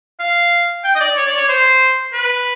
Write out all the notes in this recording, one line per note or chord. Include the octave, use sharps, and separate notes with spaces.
F5
G5
D#5
D5
C#5
D5
C#5
C5
B4